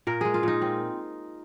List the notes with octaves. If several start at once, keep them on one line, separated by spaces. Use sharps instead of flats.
A#2 A#4
G#3 G#4
F4
A#2 D#4
C4